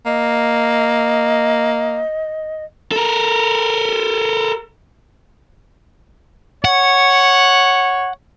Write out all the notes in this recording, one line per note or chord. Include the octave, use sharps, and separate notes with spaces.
A#3 D#5
A4 A#4
C#5 F#5